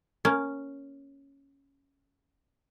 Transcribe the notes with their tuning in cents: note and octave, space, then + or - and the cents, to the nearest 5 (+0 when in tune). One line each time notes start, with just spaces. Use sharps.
A#3 +0 C#4 +0